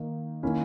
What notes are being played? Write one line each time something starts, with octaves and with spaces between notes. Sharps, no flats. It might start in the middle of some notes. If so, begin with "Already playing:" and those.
Already playing: D#3 A#3 D#4
D#3 A#3 C#4 E4